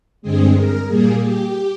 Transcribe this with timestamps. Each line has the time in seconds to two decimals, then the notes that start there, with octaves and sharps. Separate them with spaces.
0.22 G2 D3 G#3 C4 G#4
0.55 A#4
0.87 A#2 G3 A#3 G#4
1.20 G4